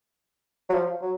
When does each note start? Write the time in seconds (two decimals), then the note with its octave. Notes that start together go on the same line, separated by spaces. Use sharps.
0.70 F#3
0.74 F3
1.02 F#3